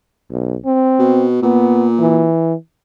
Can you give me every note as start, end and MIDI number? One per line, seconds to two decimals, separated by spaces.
0.31 0.55 35
0.65 1.26 60
0.99 1.40 47
1.43 2.28 46
1.43 1.88 59
1.99 2.54 52